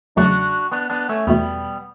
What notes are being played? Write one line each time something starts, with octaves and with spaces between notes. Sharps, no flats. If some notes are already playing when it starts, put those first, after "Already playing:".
E2 C#3 F#3 A3 D4 F#4
B3 D4
B3 D4
A3 C#4
E2 B2 G3 A3 B3